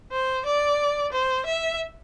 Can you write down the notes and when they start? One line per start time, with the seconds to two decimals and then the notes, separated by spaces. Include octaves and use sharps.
0.12 C5
0.45 D5
1.12 C5
1.46 E5